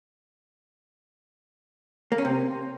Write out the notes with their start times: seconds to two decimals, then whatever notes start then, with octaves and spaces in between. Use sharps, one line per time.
2.12 A#3
2.18 C#4
2.25 C3